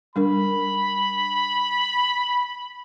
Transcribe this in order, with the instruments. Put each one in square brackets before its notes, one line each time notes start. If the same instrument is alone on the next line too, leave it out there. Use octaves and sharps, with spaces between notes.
[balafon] G3 D4 A#4 [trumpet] B5